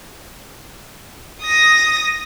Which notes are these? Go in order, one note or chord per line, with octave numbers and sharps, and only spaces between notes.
D#6 A#6